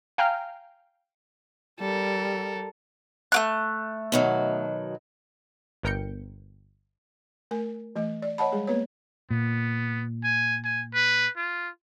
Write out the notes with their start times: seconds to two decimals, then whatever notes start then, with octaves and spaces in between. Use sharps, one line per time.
0.18 F5 G5 G#5 A#5 F6
1.80 G3 A4 A#4
3.32 A3 A#3 F#6
4.12 B2 D#3 F#3
5.83 G1 B3 A#4 G5 G6 C#7
7.51 A3 A#4 G#5
7.96 E3 A3 D#5
8.22 D5
8.38 C#5 D#5 F#5 A5 B5
8.52 G3 G#3 G#4
8.67 A#3 B3 B4 C#5
9.30 A#2 B3
10.24 G#5
10.64 G#5
10.94 B4
11.37 F4